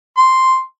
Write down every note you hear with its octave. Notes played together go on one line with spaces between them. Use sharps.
C6